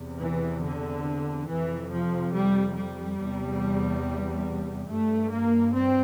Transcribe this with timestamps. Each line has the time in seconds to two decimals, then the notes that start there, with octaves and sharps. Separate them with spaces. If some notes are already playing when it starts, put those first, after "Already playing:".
Already playing: E2 C3
0.20 E3
0.63 D3
1.48 F2 C3 E3
1.90 F3
2.32 G3
2.75 G3
3.18 E2 C3
4.88 G2 A3
5.31 A#3
5.73 C4